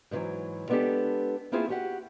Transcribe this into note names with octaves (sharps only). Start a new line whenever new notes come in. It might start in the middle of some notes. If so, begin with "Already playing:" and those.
G#2 B2 D#3 E3 F#3
G#3 B3 D4 D#4 G4 A4
A#3 C4 E4 F4 G#4 C5
F#4 G4 F#5